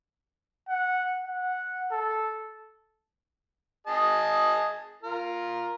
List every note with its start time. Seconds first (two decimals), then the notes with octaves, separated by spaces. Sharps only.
0.69 F#5
1.24 F#5
1.92 A4
3.87 G#4 D#5 A5
5.03 F4 A#4